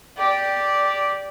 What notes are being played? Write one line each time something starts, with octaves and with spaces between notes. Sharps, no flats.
G4 D5